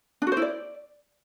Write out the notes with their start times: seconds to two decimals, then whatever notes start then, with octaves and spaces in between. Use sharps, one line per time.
0.22 D4
0.27 F#4
0.32 C5
0.37 E4
0.42 D5